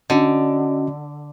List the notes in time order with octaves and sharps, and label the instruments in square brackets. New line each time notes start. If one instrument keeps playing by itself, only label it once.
[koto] D3 [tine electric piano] C#4 F#4 D#5